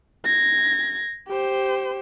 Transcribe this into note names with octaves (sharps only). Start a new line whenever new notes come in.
G#6 A#6
G4 C5